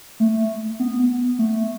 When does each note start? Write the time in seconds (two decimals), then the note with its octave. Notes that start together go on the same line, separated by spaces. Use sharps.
0.20 A3
0.80 B3
1.39 A3